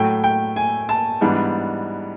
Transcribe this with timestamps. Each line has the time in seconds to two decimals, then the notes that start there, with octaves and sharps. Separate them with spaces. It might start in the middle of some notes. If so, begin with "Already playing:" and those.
Already playing: A2 F#3 A3 G5
0.24 G5
0.56 G#5
0.89 A5
1.21 G#2 E3 G3 B3 D4